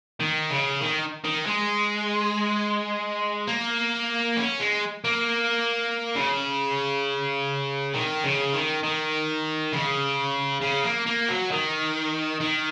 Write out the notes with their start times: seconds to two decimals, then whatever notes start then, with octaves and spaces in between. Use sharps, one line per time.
0.20 D#3
0.51 C#3
0.81 D#3
1.25 D#3
1.47 G#3
3.48 A#3
4.37 C#4
4.59 G#3
5.05 A#3
6.16 C#3
7.94 D#3
8.24 C#3
8.53 D#3
8.83 D#3
9.73 C#3
10.61 C#3
10.84 A#3
11.06 A#3
11.29 F#3
11.51 D#3
12.40 D#3